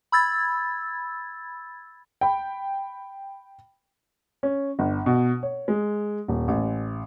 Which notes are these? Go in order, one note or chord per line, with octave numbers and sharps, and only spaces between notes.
B5 E6 G#6 A6
G5 B5
C#4
G1
B2
C#5
G#3
D#1
A1